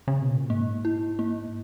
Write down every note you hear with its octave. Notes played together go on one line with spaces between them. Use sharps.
C#3
B2
A#2
G#2 A#3
E4
A#3